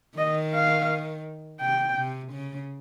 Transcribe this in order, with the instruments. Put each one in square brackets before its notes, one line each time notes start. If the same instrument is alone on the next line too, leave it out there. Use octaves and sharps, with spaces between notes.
[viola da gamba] D#3 [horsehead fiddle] D#5
[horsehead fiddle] F5
[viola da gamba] C3 [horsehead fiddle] G5
[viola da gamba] C3
C#3